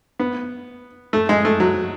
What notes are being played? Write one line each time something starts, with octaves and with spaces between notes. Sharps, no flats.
B3
A3
G#3
A3
F#3